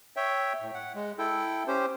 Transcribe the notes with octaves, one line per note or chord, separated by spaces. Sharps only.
C#5 E5 G5
A2
F#5
G#3
E4 A4 G5
C#4 G4 C5